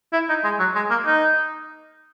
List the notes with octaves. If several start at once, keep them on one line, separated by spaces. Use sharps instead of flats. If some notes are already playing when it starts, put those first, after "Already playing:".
E4
D#4
G#3
F#3
G#3
A#3
D#4